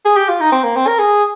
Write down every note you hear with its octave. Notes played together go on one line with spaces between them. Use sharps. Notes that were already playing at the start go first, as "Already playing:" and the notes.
G#4
G4
F4
D#4
C4
A#3
C4
A#4
G#4